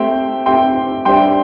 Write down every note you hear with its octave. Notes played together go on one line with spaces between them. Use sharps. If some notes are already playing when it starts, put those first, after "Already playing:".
Already playing: A3 C4 G4 E5 G5 C6
A3 C4 G4 E5 G5 C6
G3 D4 G4 C5 E5 G5 C6